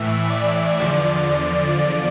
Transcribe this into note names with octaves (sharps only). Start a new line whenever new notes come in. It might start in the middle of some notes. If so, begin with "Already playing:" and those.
Already playing: A2 E3 E5
D5
E2 D3 F3 D5
D5